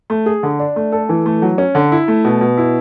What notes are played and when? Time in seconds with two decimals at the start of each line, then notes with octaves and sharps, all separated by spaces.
0.10 A3
0.26 G#4
0.43 D3
0.59 D4
0.76 A3
0.92 A4
1.09 E3
1.26 A3
1.42 F#3
1.58 C#4
1.75 D3
1.92 E4
2.08 A3
2.25 B2
2.41 B2
2.57 E4